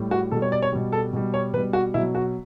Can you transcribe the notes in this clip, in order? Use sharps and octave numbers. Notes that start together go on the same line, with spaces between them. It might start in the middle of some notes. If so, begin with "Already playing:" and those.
Already playing: A2 G3
F#4
B2 G3 A4
C#5
D5
C#5
B2 G3
A4
B2 G3
C#5
B2 G3 B4
F#4
B2 F#3 E4
F#4